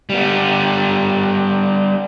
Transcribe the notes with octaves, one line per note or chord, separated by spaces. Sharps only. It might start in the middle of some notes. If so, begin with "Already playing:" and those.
G3 B3